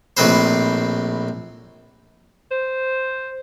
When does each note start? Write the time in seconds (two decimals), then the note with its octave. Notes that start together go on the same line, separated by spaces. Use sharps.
0.17 A#1 A2 C4 B4 C5
2.51 C5